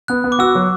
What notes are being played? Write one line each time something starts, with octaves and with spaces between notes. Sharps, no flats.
B3 F#6
B3
D6
F#4 E6
F#3